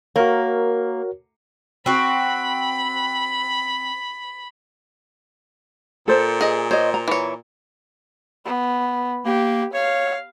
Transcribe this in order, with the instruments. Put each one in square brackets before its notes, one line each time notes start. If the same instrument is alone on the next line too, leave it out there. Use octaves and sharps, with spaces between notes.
[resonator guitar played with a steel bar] A#3 [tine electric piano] F#4 A#4 C#5
[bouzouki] C4 F#4 [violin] B5
[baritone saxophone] A#2 [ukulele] A4 C5
[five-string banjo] G#4 D#5
[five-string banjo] C5 [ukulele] C#5 D#5
[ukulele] A#5
[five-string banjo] E3 C#5
[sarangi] B3
[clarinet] A#3 [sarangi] G4
[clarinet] C#5 [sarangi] F5